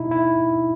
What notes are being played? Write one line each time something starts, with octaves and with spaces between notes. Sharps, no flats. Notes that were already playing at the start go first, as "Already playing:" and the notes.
Already playing: B2 D#4 E4
E4